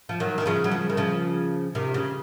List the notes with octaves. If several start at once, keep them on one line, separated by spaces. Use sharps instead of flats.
F3
D#3 F#3
D#3
C#3 F3
F#3
C#3 F3
D#3
C#3 F3
C3 D#3
C#3